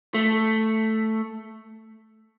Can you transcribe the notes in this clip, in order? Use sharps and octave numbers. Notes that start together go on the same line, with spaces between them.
A3